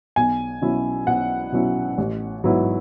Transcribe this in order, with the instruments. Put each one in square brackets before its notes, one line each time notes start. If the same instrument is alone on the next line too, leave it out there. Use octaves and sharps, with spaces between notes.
[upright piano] B1 G#5
B2 F#3 C#4 E4
B1 F#5
B2 F#3 C#4 E4
A1
G#2 F#3 B3 E4